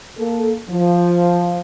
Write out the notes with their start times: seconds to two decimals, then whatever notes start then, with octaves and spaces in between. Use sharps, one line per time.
0.18 A#3 A4
0.70 F3